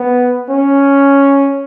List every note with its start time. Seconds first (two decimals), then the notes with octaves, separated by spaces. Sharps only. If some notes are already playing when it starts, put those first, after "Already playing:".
Already playing: B3
0.51 C#4